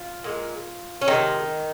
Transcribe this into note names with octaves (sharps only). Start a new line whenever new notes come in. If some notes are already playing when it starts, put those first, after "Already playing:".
Already playing: F4
A#2 G#3
C#4
C3 D#3 F3 G#3 D#4